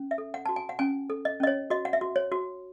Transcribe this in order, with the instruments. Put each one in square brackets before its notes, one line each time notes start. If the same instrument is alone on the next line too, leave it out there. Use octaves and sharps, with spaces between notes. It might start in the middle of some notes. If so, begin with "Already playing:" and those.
Already playing: [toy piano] C#4
E5
A4
F#5
F#4 A5
G#5
F#5
C#4 G#5
A4
D#5
C#4 D#5
C#5
F#4 D#5
F#5
E5
F#4
C#5
F#4